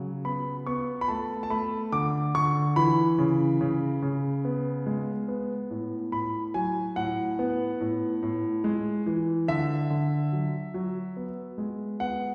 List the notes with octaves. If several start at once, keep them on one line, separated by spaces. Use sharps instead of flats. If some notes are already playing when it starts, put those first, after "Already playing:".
Already playing: C#3 F#3
B3 B5
B3 C#6
B5
A3 A5
A5
A3 B5
D3 D6
D3 C#6
E3 B5
C#3
C#3
C#3
B3
G#3
B3
A2
A2 B5
F#3 G#5
A2 F#5
B3
A2
A2
G#3
E3
D3 E5
D3
F#3
F#3
B3
G#3
B3 F#5